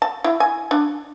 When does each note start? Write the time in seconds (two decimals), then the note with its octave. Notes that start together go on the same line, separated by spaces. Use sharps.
0.02 A5
0.24 E4
0.40 G#5
0.71 D4